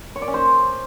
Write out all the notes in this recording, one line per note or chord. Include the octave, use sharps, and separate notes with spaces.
C#5
D5
C#4
C5